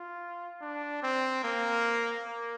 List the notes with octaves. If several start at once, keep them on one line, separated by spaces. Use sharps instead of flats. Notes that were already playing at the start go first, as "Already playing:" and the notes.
Already playing: F4
D4
C4
A#3
A#3